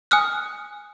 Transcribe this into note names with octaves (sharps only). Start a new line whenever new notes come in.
G#5 D#6 F6 F#6